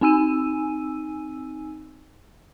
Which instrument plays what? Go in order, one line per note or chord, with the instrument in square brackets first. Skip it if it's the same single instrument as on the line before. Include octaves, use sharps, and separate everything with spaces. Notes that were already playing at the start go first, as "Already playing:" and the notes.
[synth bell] C4 D#4 G#5 E6 D#7